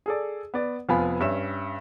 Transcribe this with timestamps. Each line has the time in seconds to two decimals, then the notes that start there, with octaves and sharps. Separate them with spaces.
0.06 G#4 A4 D5
0.54 B3 D5
0.89 F1 F3 B3 F5 G#5 B5
1.20 G2 C#4 E5 E7